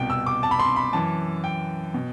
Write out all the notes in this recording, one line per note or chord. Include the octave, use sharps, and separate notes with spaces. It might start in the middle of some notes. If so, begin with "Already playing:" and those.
Already playing: C2 B2 G5
E6
D6
A5
B5
C6
B5
F#2 E3 A5
G5
B2